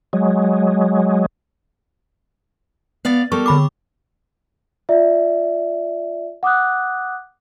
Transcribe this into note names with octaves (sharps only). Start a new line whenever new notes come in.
F#3 G#3
B3 D5 F5
G3 A4 A#4 C#6
D3 B5 D6
F4 D5 E5
F#5 D6 D#6 F#6